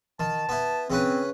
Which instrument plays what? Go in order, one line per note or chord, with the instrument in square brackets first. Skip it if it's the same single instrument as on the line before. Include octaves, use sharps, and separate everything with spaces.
[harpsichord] D#3 [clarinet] A5
[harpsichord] B3 E4
[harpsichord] C#3 C#4 B4 [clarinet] C4